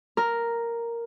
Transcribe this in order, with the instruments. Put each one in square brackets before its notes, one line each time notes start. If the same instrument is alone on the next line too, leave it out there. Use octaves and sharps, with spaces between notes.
[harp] A#4